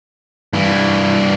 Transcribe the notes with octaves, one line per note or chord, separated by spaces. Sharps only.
G2 E3